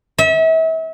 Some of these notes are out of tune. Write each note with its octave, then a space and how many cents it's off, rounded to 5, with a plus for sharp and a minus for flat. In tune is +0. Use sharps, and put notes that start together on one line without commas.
E5 -35